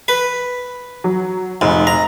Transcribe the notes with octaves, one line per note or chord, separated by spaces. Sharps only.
B4
F#3
F1 G#2
A#5